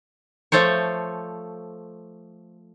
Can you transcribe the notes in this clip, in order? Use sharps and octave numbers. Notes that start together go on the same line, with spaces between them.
F3 A3 A4 C5 C#5